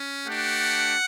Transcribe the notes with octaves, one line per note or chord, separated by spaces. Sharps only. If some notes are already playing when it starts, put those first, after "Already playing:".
Already playing: C#4
A3 D4 G4 F#5